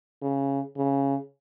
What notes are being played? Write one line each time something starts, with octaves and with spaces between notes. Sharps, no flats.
C#3
C#3